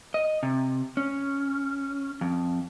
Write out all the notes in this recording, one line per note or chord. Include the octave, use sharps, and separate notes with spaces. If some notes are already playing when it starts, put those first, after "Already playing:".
D#5
C3
C#4
F2